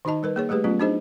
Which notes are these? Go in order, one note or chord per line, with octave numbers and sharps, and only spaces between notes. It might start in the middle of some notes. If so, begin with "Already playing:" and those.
D#3 D#4 F#4 D#5 A5
G3 A#4 B4
A#3 G#4 C#5
G3 A3 G4 G#4 B4
F#3 A3 B3 C#4 F4
D4 D#4 F#4 G#4 C5 D#5